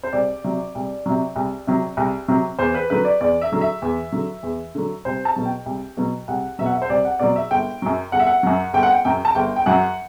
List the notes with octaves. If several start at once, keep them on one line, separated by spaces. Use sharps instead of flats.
C5
C2 D5
C3 F#3
C2
C3 F#3
C2
C3 F#3
C2
C3 F#3
E2 C5
B4
D3 F#3 B4
D5
E2 D5
E5
D3 F#3
E5
E2
D3 F#3
E2
D3 F#3
C2 C5
A5
B2 F#3
G5
C2
B2 F#3
C2 F#5
B2 F#3 E5
F#5
E5
C5
C2 D5
F#5
B2 F#3 D5
E5
G1 G5
F#2 F#3
G1 F#5
E5
F#5
F#2 F#3
G1 G5
F#5
G5
F#2 F#3 G5
A5
G1 G5
G5
F#2 F#3 F#5